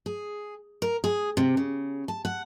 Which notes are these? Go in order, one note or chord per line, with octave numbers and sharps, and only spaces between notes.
G#4
A#4
G#4
C3
C#3
A5
F#5